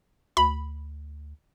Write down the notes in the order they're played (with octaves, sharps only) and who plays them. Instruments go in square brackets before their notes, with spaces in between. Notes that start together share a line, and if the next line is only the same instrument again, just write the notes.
[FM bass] D2 [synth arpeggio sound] B5